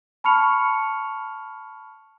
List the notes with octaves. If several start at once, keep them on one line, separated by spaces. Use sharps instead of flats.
A5 B5 C#6 F6 C#7 F7